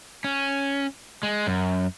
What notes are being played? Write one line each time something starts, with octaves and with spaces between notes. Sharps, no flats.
C#4
G#3
F#2